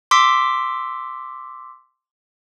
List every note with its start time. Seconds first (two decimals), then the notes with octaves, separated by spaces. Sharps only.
0.11 C6 D6 E6 B6